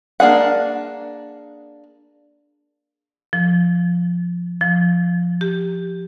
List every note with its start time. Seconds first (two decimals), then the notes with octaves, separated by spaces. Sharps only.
0.20 A#3 D4 G#4 F#5
3.33 F3
4.61 F3
5.41 G4